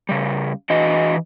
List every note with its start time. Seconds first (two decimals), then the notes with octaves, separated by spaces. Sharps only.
0.09 C#3 G3
0.70 E3 D4 F#4 D#5